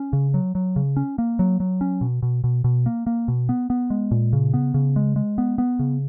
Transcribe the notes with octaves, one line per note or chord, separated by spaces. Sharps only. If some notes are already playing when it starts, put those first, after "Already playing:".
Already playing: C#4
C#3
F#3
F#3
C#3
C#4
A#3
F#3
F#3
C#4
B2
B2
B2
B2
A#3
A#3
B2
B3
B3
G#3
A#2
C#3
B3
C#3
G#3
G#3
B3
B3
C#3